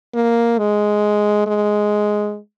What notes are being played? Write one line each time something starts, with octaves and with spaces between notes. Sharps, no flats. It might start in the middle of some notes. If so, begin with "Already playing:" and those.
A#3
G#3
G#3